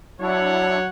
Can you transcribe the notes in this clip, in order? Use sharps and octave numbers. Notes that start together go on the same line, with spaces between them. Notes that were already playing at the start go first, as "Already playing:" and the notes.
F#3 D4 E4 C#5 F#5